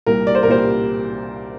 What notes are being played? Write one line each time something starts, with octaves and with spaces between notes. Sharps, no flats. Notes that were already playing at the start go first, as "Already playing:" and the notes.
C2 A#2 G3 A#4
D5
C5
A#4
C2 A#2 G3 C5